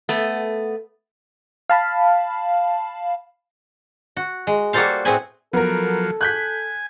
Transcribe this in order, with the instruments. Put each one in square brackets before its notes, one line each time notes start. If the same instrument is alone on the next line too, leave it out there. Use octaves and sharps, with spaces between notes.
[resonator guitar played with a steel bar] A3 B3
[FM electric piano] F5 A5 B5
[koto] F#4
G#3
G3 A#3 F#4 A4 C5 F5
A2 C4 F#4 G#4 B4 G#5
[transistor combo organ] F3 F#3 [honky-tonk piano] B3 A#4 [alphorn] A4
[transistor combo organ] G#5 [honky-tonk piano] F#6 G6 B6